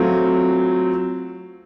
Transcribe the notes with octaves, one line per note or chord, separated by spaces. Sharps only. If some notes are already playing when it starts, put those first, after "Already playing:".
Already playing: F#3 A3 C4 F4